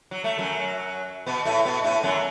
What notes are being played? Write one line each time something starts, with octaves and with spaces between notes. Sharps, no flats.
F#3
A3
F#2 F#3
B2 B3
A2 A3
B2 B3
A2 A3
F#2 F#3